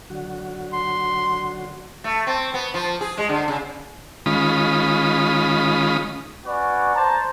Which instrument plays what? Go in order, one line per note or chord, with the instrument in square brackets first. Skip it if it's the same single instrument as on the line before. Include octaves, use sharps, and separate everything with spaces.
[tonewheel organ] D3 F#3 F#4
[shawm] C6
[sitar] A3
C4
B3
F3
G#4
G#3
D3
C#3
[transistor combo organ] D#3 G#3 C#4 F4 B5 D#6
[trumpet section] C#4 F#4 B4 D5
C5 A5 A#5